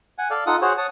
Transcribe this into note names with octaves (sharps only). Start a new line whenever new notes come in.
F#5 G#5
A4 D5 F5
D#4 F4 A4 F#5 D#6
F#4 G#4 C5 C#5 F#5
C#5 F#5 A5 D#6